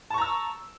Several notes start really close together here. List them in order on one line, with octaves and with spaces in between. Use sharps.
A5 C#6 A#5 E6